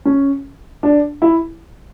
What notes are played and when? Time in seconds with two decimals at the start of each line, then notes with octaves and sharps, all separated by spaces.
0.05 C#4
0.83 D4
1.22 E4